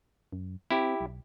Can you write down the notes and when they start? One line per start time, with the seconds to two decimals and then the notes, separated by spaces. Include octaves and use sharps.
0.33 F#2
0.71 C4 E4 G4
1.01 B1